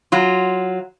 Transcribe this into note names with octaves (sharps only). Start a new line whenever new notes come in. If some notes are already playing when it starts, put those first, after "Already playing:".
F#3 F4